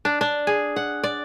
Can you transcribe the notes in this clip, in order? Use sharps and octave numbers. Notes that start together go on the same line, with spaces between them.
D4
D4
G#4
F#5
D5